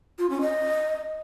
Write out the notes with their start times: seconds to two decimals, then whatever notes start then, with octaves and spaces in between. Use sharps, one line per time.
0.19 F4
0.30 C#4
0.41 D#5